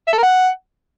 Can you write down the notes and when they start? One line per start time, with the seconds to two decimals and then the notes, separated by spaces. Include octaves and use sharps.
0.08 E5
0.13 A4
0.18 A#4
0.23 F#5